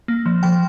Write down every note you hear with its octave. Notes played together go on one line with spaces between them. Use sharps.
A#3
F3
F3 G5